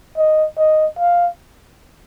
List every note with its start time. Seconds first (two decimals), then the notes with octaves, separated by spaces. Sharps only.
0.17 D#5
0.57 D#5
0.99 F5